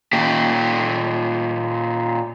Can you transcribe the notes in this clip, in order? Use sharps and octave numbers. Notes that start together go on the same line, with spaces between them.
A#2 G4